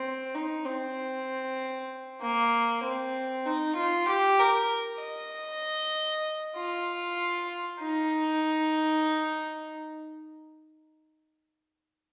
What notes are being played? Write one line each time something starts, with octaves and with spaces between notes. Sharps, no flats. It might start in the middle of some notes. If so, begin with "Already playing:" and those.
Already playing: C4
D#4
C4
A#3
C4
D#4
F4
G4
A#4
D#5
F4
D#4